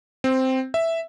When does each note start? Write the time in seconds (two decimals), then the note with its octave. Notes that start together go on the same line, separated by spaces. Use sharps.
0.24 C4
0.74 E5